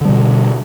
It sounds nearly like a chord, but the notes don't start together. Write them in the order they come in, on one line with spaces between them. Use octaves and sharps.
D3 G3 B2